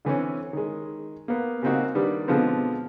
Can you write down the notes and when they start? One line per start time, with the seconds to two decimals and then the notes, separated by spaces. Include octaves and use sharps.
0.05 D3 E3 C4 C#4
0.53 D#3 G#3
1.28 A#3 B3
1.62 C#3 G3 A#3 C4 D#4 F#4
1.95 D#3 G3 D4 B4
2.28 B2 D3 F3 G#3 B3 C4